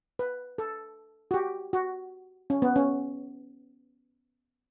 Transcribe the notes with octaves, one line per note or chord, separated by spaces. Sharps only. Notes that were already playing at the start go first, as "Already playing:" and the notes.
B4
A4
F#4
G4
F#4
C#4
B3
C#4